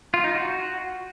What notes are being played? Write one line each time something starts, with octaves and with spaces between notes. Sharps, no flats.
F4
D#4
F#4